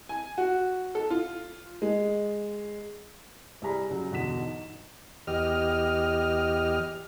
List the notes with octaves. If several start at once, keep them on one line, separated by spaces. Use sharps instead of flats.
G#5
F#4
A4
F4
G#3
C2 G3 G#4 A#5 B5
C#3 F#3
G1 E2 B2 D3 B6 E7
D#4
E2 G4 D#5 F6